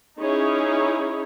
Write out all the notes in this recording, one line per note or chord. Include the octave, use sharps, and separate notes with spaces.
C#4 D#4 E4 G#4 C#5